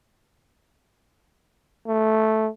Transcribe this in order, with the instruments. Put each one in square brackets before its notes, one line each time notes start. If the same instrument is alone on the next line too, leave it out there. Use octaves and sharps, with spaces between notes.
[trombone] A3